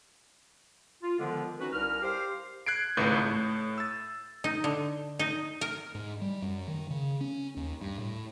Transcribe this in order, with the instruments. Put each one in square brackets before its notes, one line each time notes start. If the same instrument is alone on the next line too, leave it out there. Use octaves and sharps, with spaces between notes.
[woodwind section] F4
D3 D#3 F3 G#3 B3
C#4 D#4 F#4 B4
C2 A#4 F6
G4 C5 F5
[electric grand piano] F#6 G#6 C7 D7
G#1 C#2 A2 B4 G6
A2
E6 A6
[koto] D#4
D3
D#4
A#4
[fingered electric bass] G#2
G3
F#2
D#3
C#3
C#4
D#2
G2
A2